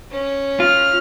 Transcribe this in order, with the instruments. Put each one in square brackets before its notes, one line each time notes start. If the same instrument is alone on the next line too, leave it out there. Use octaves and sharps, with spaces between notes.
[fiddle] C#4
[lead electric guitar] F4 [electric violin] F6